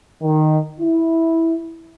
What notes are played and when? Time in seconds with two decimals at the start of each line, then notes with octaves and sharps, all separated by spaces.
0.22 D#3
0.80 E4